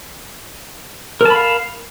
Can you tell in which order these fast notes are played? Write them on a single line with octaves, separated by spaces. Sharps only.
A#4 A5 B5 F5